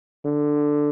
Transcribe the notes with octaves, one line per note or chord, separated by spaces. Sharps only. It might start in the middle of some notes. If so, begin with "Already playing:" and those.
D3